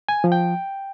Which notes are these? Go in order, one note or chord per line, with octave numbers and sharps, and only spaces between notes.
G#5
F3
G5